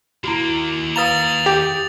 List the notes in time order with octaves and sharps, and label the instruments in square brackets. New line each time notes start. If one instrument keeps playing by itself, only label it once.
[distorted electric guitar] D#2 A#3 [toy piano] E4 F#4
[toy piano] B4 F5 A#5 [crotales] D#6 A6 F7
[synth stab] G4